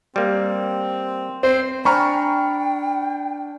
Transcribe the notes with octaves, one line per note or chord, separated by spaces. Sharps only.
G3 A#3 C4
C4 C5
D4 C5 G5 G#5 A#5 B5 C#6 F6